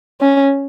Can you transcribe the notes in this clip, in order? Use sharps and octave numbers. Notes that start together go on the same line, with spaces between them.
C#4